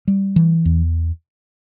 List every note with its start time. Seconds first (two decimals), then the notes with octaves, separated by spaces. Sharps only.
0.08 G3
0.36 E3
0.65 E2